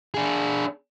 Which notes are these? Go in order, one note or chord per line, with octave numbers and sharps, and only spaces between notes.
D4 G#4